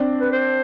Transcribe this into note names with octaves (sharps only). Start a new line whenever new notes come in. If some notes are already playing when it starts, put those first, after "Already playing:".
Already playing: C4 D4
B4
C5